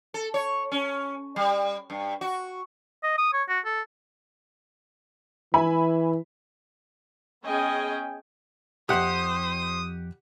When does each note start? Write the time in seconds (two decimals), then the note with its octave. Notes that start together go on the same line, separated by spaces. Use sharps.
0.14 A4
0.34 C#5
0.72 C#4
1.36 G3
1.90 G2
2.21 F#4
3.03 D#5
3.18 D#6
3.33 C#5
3.49 F#4
3.65 A4
5.54 E3 E5 G#5 B5
7.46 B3 C#4 G#4 D#5 G5 G#5
8.89 B1 F2 G4 C5 F#5 D#6